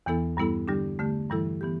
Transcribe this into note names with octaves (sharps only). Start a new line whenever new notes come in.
E2 E3 B3 E4 A4
G2 G3 B3 E4 A4
D3 G3 D4 G4
D3 A3 G4
G2 E3 G3 E4 A4
E3 B3 G4